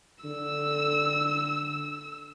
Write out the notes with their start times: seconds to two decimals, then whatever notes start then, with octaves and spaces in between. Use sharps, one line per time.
0.24 D3 E6